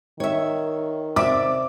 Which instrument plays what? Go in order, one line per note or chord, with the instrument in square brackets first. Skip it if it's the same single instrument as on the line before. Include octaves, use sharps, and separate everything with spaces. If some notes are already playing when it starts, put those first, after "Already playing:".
[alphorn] D#3 [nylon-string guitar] C#5 E5
[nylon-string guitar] C3 D5 E5 [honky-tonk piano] D6